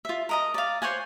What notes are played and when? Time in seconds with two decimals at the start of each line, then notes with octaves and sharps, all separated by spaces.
0.05 F4 E5
0.29 A#4 D#5 A#5
0.54 D5 F5
0.82 C5 C#5 F#5 G#5